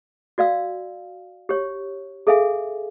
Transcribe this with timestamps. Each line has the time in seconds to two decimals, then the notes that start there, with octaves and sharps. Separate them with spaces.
0.38 F#4 D5 F5 E6
1.49 G4 C#5
2.27 G#4 A4 E5 F5 G#5